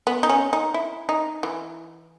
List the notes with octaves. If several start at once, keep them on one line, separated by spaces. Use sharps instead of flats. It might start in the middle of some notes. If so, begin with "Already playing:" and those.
B3
D#4
C#4
D#4
E4
D#4
E3